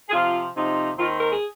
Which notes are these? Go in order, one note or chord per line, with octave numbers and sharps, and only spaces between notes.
G#4
C3 F3 C4 F4
C3 F3 C4 D#4
D#2 D#3 C4 D#4 F4
A#4
G#4